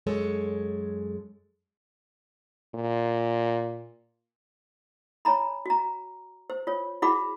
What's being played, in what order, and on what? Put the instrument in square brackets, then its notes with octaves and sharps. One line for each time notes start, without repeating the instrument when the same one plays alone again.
[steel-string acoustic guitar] F#2 G#3 A4 C#5
[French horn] A#2
[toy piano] C#5 G#5 A#5 B5
F#4 A#5
C5
F4 C#5
E4 F#4 G#4 F#5 B5 D6